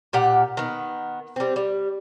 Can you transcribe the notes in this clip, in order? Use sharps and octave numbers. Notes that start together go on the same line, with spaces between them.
A#2 G4 F#5
D#3 B3
G3 C4
G3